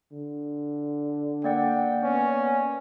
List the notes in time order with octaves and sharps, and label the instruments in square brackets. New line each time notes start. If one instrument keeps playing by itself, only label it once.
[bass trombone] D3
[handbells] A#3 D5 F#5 [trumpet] G5
[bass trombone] B3 [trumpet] C#4